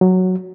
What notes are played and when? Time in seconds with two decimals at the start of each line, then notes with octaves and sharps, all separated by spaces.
0.01 F#3